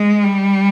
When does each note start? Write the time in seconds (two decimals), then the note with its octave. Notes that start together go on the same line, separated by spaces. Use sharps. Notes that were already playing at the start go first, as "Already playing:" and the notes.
Already playing: G#3
0.24 G3